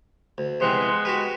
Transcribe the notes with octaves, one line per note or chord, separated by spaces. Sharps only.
D2
C3 E3 G#3 B3 C4 C5
F#4 G4 B4